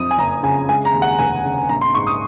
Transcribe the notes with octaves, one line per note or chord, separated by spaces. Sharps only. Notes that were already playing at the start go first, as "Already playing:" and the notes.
Already playing: F2 F3 D#6
G#5
F#1 A#5
C#3 G#5
G#3 G#5
A#5
D#2
F#5
F1 G#5
C#3
A#1 A#5
C6
G#2 C#6
D#6